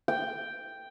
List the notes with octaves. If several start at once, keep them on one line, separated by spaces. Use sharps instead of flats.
G5